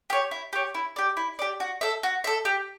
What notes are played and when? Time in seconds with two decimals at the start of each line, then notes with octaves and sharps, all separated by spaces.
0.10 G4 C#5
0.31 E4
0.53 G4 C#5
0.74 E4
0.96 G4 D5
1.17 E4
1.39 G4 D5
1.60 F#4
1.81 A4 E5
2.03 F#4
2.24 A4 E5
2.45 G4